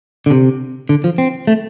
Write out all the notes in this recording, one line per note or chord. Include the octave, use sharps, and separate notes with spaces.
D3
C3
D3
F3
C4
A3